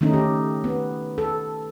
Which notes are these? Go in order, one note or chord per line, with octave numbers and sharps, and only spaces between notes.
D#3 A3 C#4 D#4
G4
B3
A4